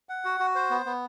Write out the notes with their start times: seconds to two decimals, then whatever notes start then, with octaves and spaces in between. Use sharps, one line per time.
0.09 F#5
0.25 F#4
0.40 F#4
0.55 C5
0.70 B3
0.86 B3